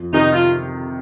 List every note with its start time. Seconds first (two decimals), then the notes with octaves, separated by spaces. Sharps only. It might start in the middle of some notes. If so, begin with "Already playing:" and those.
Already playing: F2
0.13 C3 D#3 D#4
0.32 F4